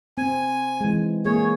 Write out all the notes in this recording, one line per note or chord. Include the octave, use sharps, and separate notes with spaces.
C4 G#5
E3 G#3
A#3 G#4 C#5